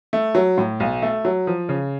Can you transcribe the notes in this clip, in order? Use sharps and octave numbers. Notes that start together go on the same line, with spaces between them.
A3
F#3
A2
B1
A3
F#3
F3
C#3